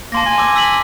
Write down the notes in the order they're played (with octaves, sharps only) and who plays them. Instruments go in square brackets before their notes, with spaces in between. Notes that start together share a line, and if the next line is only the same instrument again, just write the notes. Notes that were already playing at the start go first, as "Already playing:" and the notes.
[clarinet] A#3 [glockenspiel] A5 C6 A#6
[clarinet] G#5
[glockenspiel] D6 E6
E6 B6 F#7